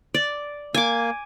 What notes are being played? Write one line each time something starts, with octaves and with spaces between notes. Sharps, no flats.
D5
A#3 G#5 D6